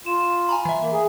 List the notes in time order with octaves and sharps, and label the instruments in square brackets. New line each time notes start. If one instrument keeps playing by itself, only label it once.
[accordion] F4 [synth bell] E7
[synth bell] G#5 A#5 B5
E3 E5
[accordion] A#3
G#4